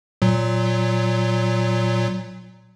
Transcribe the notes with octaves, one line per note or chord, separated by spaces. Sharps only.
A#2 F#3